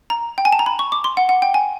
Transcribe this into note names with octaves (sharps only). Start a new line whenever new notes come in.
A#5
G5
G#5
A5
A#5
B5
C#6
D6
C6
F#5
F#5
G5
G#5